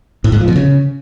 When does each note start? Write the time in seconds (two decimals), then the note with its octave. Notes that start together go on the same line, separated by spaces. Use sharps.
0.24 A2
0.32 G#2
0.40 F3
0.48 B2
0.56 C#3